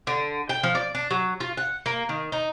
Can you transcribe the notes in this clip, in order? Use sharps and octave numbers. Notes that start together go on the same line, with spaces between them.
D3
G5
F3
D5
D4
F#3
F4
F#5
A#3
D#3
D#4